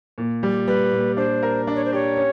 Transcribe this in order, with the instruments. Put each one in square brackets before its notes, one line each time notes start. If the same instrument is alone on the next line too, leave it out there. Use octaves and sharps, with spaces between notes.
[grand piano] A#2
G3
[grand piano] G3 [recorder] B4
[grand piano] A#2
[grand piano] D4 [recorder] C5
[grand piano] A#4
[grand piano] D4 [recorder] D5
[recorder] C#5
C5
[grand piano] G4 [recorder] C#5
[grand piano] C#4